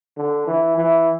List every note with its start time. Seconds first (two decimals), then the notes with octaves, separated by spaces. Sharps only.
0.17 D3
0.47 E3
0.77 E3